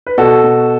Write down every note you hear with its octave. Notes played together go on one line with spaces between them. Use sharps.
B4
B2 F#4 A4
B2